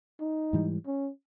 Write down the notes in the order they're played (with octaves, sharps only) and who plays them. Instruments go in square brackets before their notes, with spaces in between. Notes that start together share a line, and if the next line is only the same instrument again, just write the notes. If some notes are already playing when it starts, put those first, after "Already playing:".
[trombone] D#4
[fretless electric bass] G#2 E3 G3
[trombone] C#4